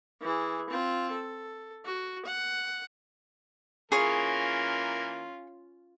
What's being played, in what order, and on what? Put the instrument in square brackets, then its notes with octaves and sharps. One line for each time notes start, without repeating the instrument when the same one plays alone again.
[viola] E3 G#4
C4 F4
A4
F#4
F#5
[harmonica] E3 A#3 A#4 [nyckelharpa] C#4 F4 [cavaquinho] G#4 C#5